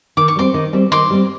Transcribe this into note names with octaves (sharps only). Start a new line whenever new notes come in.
D#3 D6
C#6
G3 C4 C6 D6
D#3
G3 C4
D#3 C6 D6
G3 C4